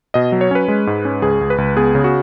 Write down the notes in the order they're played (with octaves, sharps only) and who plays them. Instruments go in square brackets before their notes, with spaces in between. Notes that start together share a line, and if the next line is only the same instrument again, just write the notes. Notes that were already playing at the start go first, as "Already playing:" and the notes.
[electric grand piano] B2 D#5
F#3
C#5
C#4 B4
G#3
G#2
C#4
C#2 G#4
C#2
B4
C#2
B3 G#4
C#3
F#4